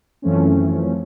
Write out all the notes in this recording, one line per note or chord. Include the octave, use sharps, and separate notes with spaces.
F#2 E3 F3 A3 C4 C#4